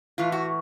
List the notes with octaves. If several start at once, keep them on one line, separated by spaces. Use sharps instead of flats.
A2 E3 F4
F#4